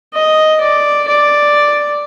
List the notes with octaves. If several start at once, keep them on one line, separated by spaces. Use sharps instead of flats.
D#5
D5
D5